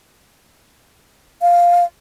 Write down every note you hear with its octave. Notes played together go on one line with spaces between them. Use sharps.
F5